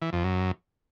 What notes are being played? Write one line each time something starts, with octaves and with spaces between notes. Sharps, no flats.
E3
F2
F#2